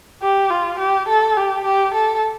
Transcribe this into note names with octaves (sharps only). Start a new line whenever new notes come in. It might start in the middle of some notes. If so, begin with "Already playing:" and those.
G4
F4
G4
A4
G4
G4
A4